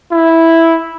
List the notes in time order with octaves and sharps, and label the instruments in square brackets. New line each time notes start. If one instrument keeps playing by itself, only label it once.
[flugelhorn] E4